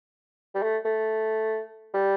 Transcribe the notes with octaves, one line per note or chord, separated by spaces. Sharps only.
G3
A3
A3
G3